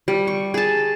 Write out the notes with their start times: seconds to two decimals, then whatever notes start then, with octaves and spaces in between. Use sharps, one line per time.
0.08 G3
0.27 C#6
0.54 G#4 A5